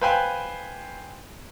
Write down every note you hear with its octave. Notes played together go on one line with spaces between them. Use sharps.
B4 C5 F5 G5 G#5 B5